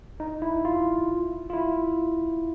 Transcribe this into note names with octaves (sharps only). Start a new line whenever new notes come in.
D#4
E4
F4
F4
E4